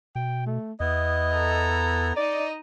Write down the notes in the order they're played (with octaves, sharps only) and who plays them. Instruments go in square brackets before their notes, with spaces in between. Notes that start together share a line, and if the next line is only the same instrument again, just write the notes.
[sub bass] B2 [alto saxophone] G5
[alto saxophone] A3
[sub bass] E2 [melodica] B3 E4 [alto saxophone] D#5
[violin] A4 A#5
[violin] D#4 D#5 [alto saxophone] D5